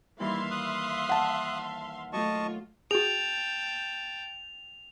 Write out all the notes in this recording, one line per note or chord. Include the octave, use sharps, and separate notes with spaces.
D#2 E3 G3 E4 E5 F5 C6
D#6 F#6
F#5 A5
F#3 A3 F4 D#5 A5 C#6
F#4 G#4 G5 A5 F7